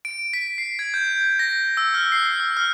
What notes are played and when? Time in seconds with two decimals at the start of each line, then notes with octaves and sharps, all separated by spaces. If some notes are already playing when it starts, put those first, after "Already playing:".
0.05 D7
0.33 B6
0.58 C7
0.79 G#6
0.94 G6
1.39 A#6
1.77 E6
1.94 F6
2.12 C7
2.40 E6
2.57 F6